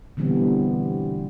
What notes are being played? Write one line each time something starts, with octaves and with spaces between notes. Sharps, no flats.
B2 D3 E3 G3 B3 C4